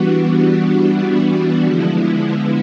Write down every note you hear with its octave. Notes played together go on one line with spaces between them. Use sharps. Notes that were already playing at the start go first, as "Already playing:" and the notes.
Already playing: E3 G3 B3 D4 F#4
D3 F3 G#3 B3 E4